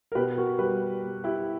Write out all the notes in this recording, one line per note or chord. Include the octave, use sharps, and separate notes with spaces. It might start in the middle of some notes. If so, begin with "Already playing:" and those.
A#4
B2 G4 B4
F#4 A#4
G3 G4 B4
B2
E4 G4